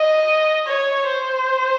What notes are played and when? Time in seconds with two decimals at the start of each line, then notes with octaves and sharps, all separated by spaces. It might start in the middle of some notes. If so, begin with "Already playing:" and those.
Already playing: D#5
0.66 C#5
1.08 C5